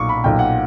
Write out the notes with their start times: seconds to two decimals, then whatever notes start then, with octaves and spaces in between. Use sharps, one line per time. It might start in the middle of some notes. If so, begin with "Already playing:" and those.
Already playing: B1 A#2 C#6 D6
0.09 B5
0.24 B1 A#2 G5
0.39 F#5